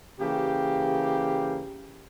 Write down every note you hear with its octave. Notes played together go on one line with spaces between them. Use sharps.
C#3 E3 A#3 G4